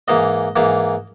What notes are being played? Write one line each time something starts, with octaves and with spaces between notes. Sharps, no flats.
G#2 E3 A#3 D#5
G#2 E3 A#3